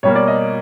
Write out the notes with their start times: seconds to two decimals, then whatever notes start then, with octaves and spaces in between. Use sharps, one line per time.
0.03 B2 G3 A#3 C#5
0.15 D5
0.28 D#5